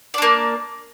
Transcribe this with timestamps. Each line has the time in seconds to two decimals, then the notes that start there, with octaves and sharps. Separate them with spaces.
0.14 D5
0.18 D4
0.22 A#3